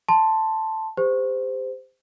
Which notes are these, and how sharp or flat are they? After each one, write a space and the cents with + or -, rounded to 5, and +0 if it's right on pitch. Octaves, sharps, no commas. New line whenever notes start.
A5 +0 C6 +0
G4 +35 C5 -20